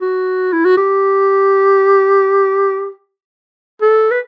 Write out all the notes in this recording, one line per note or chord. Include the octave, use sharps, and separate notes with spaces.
F#4
E4
F#4
G4
A4
B4